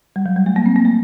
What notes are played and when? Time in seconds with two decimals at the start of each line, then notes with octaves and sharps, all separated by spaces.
0.16 G3
0.26 F#3
0.36 G3
0.46 A3
0.56 A#3
0.66 C4
0.76 A#3
0.85 A3